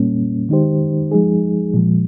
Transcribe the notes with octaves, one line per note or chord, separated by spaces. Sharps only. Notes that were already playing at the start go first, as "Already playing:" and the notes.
Already playing: A#2 G3 A#3 C#4
D#3 G#3 D#4 G4 C5
F3 G#3 D#4 G#4
A#2 F3 G#3